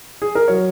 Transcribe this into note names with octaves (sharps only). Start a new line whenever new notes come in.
G#4
A#4
F#3 C#5